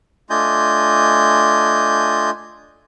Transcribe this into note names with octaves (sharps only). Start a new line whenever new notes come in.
A3 D4 F4 D#5 G#5 G6